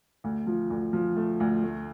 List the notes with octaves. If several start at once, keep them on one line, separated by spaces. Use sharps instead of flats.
D2
F3
D2
F3
A3
D2
A3